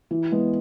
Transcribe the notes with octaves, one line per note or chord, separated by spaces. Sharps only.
E3
G#3 B3